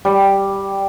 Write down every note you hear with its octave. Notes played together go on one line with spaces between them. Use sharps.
G3